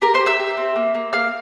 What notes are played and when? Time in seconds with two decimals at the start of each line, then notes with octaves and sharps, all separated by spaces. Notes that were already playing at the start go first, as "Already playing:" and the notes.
0.02 G4 A#4 A#5
0.14 C5 C6
0.20 G4
0.26 E5 E6
0.40 G4
0.57 C4
0.76 A#3
0.95 A#3
1.13 A#3 F5 F6